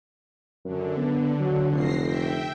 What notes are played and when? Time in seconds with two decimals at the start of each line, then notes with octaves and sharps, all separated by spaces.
0.65 F#2 D3
0.97 B3
1.40 F#3
1.73 F1 A#6 C7
2.03 E5 G5